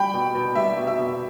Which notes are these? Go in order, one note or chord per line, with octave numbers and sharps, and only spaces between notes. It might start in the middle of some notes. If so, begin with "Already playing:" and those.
Already playing: G3 G5 B5
B2
B2
G3 E5
B2
E5
B2